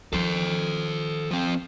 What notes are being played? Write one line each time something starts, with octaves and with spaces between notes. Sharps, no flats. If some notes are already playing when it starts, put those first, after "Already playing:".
D#3 F3 A4 C5
F3 C4